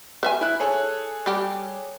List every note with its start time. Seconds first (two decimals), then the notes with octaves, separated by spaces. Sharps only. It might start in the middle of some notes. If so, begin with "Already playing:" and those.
0.23 B4 E5 G#5
0.41 E4 F#6
0.60 G#4 A4 C#5
1.26 G3 G4